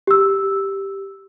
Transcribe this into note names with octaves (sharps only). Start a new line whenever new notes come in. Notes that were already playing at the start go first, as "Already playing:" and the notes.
G4 E6